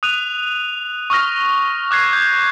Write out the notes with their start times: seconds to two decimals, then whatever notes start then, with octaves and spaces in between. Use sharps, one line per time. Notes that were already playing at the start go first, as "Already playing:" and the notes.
0.03 D#6 F#6 D#7 F7
1.10 C#6 D#6 F6 A#6
1.91 D6 F#6 G#6 C7
2.13 G6